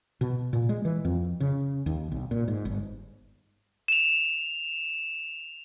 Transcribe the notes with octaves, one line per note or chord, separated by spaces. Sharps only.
B2
A#2
G#3
E3
F2
C#3
D#2
B1
A#2
G#2
G1
E7 F7